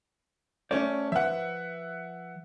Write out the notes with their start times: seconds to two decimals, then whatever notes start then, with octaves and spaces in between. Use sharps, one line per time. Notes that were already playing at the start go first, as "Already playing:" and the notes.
0.71 A3 C#4 C5 D5
1.12 F3 B4 E5 F#5